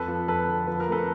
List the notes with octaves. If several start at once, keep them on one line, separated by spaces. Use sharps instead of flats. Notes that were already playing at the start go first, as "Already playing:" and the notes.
Already playing: F2 A4 B4
F3
F2 A4 B4
D3
F3 B4
A#4
A3 A4 B4